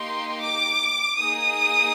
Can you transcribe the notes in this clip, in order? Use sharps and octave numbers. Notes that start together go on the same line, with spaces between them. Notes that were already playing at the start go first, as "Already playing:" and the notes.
Already playing: A#3 D#4 G4 C6
D6
A#3 D#4 G#4 D#6